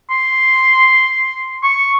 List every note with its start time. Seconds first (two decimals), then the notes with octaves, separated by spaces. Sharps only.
0.10 C6
1.64 C#6